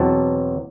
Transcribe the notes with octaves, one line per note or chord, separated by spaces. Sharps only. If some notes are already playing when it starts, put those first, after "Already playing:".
Already playing: E2 B2 F#3 C4 A5